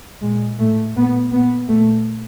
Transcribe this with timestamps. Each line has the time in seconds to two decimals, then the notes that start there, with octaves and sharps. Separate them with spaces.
0.21 A#2 G#3
0.58 A2 A3
0.95 A#2 B3
1.32 A#2 B3
1.68 A#2 A3